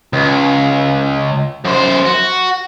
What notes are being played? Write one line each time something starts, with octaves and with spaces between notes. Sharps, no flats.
C#2
F#2 C5
F#4